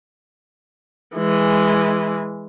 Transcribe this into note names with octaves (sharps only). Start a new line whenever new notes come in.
E3 G#3